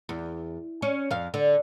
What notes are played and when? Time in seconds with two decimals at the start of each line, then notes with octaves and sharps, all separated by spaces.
0.09 E2
0.82 C#4
1.11 F2 F5
1.34 D3